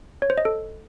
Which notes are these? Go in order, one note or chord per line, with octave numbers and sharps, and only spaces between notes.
C#5
C5
D#5
A4